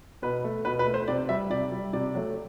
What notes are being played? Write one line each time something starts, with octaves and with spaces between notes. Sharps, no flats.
B2 B4
A3
B2 B4
B4
A3
C5
C3 D5
G3 E5
C3 D5
G3
C3 D5
F#3 A3